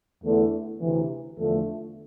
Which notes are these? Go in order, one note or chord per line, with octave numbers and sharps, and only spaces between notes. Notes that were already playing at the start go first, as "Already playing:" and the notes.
E2 D3 A3 E4
D2 C3 E3
E2 D3 F3 A3